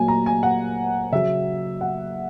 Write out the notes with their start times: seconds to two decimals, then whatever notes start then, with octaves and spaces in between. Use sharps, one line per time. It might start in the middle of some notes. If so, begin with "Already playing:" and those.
Already playing: A#2 F#3 G#5
0.08 A#5
0.26 G#5
0.43 F#5
1.12 C#3 F#3 E5
1.81 F#5